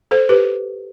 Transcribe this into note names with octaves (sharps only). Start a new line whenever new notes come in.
A4 C5
G4 B4